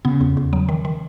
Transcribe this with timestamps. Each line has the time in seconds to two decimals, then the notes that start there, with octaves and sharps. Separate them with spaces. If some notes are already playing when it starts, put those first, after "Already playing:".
0.05 C#3 B3
0.21 E2
0.37 E2
0.53 F#3
0.69 D#3
0.85 D#3